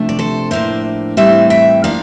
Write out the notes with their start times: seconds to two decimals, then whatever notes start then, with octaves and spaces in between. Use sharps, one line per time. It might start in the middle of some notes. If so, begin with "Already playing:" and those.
Already playing: C3 F3 A3 D4
0.09 D5
0.19 A4 C5
0.51 A2 F3 A#3 D4 C5 E5
1.17 A2 E3 G3 C4 C5 E5
1.50 E5 G5
1.84 F3 A#3 D4 D5 F5